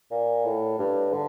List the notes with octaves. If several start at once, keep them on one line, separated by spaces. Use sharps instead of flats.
A#2
A2
G2
D3